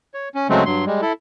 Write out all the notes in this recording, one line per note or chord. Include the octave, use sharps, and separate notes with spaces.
C#5
C#4
C#3 F#3 G#3 A3 C4
G2 F#3 C6
G3 G#3
E4 A4